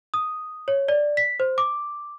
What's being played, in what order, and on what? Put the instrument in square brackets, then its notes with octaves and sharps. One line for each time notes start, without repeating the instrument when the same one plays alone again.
[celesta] D#6
C#5
D5
B6
C5
D6